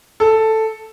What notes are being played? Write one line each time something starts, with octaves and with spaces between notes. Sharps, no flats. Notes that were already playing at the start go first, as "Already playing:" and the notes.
A4